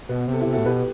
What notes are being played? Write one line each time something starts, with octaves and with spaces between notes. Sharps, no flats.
B2 B3
C3
A4
E4 G4
C3
F#4 A4
A2
B2 G4 B4